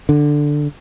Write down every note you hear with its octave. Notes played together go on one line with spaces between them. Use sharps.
D3